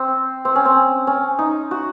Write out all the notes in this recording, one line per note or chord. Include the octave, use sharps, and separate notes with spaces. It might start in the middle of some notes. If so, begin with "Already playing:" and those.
Already playing: C4
C4
C#4
C4
C#4
D#4
F#4